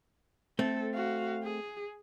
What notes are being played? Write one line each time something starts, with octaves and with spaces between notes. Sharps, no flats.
A3 C4 A4
F#4 F5
G#4